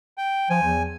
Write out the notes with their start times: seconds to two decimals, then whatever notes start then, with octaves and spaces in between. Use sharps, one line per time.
0.18 G5
0.50 F3 G#5
0.62 E2